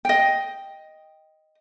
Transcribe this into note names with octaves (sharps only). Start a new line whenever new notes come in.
D#5 G5